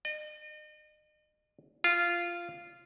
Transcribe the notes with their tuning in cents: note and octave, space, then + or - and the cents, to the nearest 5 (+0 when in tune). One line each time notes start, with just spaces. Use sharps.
D#5 -40
F4 -10